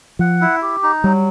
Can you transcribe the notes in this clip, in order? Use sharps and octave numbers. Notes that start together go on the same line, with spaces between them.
F3 F#5
E4
G4
D#4
F#3 G3